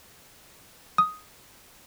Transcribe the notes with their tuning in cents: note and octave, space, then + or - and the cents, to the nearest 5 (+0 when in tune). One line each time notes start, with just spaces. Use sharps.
D#6 +5